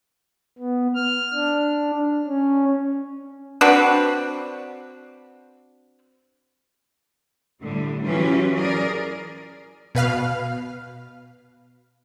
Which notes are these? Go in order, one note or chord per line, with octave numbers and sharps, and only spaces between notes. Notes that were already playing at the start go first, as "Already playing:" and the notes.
B3
F6
D4
C#4
C4 D4 F#4 B4
A2 D3 G3
E3 F#3 C#4 F4 G4 B4
G#4 A#4 D5
B2 B4 F5 F6